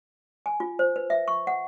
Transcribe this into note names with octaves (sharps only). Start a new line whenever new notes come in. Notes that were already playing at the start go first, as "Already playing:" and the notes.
G#5
F4
C5
B4
E5
C#6
F#5